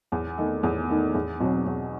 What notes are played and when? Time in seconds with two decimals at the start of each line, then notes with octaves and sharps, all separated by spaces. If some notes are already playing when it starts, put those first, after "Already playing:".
0.12 E2
0.38 D#3 A3 D#4
0.63 E2
0.90 D#3 A3 D#4
1.14 E2
1.40 B2 F#3 C4 F#4
1.66 E2